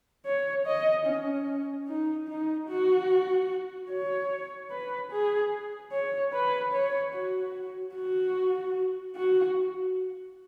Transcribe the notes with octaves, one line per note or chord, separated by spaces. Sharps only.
C#5
D#5
C#4
D#4
D#4
F#4
C#5
B4
G#4
C#5
B4
C#5
F#4
F#4
F#4